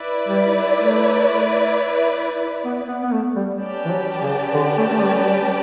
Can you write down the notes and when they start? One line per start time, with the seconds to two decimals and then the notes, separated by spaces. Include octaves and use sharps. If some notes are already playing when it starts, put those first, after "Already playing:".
Already playing: E4 B4 D5
0.28 G3
0.76 A3
2.65 B3
2.88 B3
3.03 B3
3.13 A3
3.36 G3
3.60 C#4 G4 B4 D5 A5
3.85 E3
3.91 F#3
4.22 C#3
4.54 D3
4.78 A3
4.90 A3
5.01 G3
5.15 F#3
5.25 G3